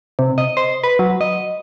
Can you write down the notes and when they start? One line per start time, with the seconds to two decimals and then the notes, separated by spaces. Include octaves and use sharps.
0.19 C3
0.38 D#5
0.57 C5
0.83 B4
0.99 F#3
1.21 D#5